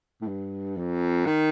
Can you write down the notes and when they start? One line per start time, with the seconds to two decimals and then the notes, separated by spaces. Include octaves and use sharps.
0.21 A2
0.27 G2
0.77 F2
1.26 D#3